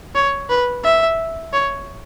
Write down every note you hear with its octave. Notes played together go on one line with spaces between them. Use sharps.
C#5
B4
E5
C#5